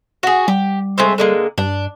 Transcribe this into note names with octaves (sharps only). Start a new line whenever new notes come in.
F#4 G#4
G3 G4
G#3 A3 C4
D3 G#3 A#3
G2 D4